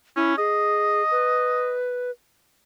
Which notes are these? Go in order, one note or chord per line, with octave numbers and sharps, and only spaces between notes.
C#4 E4
G#4 D#5
B4